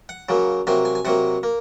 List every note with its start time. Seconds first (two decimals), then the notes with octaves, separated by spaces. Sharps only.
0.09 F#5
0.29 C#3 F#3 A#3
0.67 C3 F#3 A#3 G#5
0.85 G#5
0.95 G#5
1.05 C3 F#3 A#3 F#5
1.43 A#3